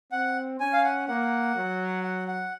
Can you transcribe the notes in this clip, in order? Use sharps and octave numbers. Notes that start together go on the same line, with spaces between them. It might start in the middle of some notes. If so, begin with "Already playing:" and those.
C4 F#5
C#4 G#5
F5
F#5
A#3 F#5
F#3
F#5
F#5